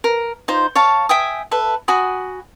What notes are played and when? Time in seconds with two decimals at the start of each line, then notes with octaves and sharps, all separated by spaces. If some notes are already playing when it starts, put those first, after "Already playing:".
0.04 A#4
0.48 D#4 F4 C5
0.75 C#5 F5 A5
1.09 E5 G5 G#5 D#6
1.51 A4 B4 E5
1.88 F#4 G#5 B5 D#6